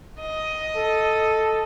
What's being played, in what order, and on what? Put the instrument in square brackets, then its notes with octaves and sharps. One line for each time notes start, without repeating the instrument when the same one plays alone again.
[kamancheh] D#5
[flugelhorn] A4